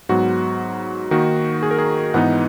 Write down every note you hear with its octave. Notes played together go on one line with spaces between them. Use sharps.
G#2 F#3 B3 F#4
D#3 A#3 D#4 F#4
G#4
A#4
G#4
G#2 E3 B3 D#4 F#5